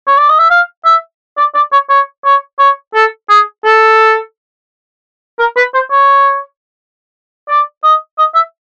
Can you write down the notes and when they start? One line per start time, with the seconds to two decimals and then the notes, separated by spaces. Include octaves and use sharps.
0.07 C#5
0.17 D5
0.29 D#5
0.39 E5
0.50 F5
0.85 E5
1.37 D5
1.55 D5
1.72 C#5
1.89 C#5
2.25 C#5
2.59 C#5
2.94 A4
3.29 G#4
3.64 A4
5.39 A#4
5.56 B4
5.74 C5
5.91 C#5
7.48 D5
7.83 D#5
8.18 D#5
8.35 E5